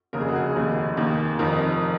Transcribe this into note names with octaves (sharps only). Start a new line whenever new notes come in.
F1 D#2 C#3 A#4
G#4
F#4
G#4
F1 D#2 D#3
D#2 D#3
F1 F2 D#3 A#4